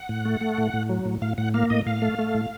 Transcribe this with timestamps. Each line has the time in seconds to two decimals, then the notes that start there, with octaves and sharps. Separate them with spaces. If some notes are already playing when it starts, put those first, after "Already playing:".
Already playing: F#5
0.09 A2
0.25 A3
0.41 A3
0.58 A2
0.73 A2
0.89 F#3
1.05 A2
1.22 A2 F5
1.38 A2 F#5
1.54 A#3 F5
1.70 A2 D#5
1.86 A2 F5
2.02 A3
2.19 A3
2.35 A2